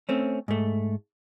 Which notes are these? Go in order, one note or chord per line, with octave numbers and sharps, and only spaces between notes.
A3 C4 C#4
G#2 A3